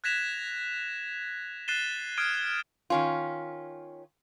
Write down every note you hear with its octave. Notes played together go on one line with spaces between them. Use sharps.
F#6 G#6 A#6 B6 E7 F7
F#6 A6 C7 D#7 E7 G7
D#6 F6 G#6 D7 D#7
D#3 C#4 F4